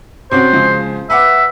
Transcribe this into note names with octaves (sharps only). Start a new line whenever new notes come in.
C3 C#4 F#4 C5
C#3 F3 G#3
B4 E5 F#5 D6